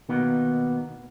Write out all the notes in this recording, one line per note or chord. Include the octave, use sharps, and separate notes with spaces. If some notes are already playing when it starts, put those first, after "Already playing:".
B2 D#3 A#3 B3